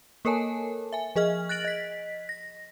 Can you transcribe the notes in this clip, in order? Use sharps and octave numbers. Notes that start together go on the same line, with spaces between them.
A#3 A4 A#4 C#5 G#5 A5
E5 G#5
F3 G#4 D#5 F6
F#6 A6 A#6 D7 F#7
D#5 B6
A#6